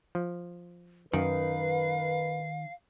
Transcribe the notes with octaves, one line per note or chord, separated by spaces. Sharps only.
F3
F#2 D#3 D#4 A#4 B4 F5